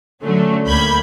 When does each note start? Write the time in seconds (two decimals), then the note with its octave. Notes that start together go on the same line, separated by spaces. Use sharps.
0.22 D3 F#3 A3 C#4
0.66 D2 A#3 B5 G6 G#6